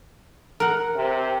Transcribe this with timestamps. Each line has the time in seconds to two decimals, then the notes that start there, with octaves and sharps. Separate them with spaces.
0.60 A#4 F#5
0.95 C3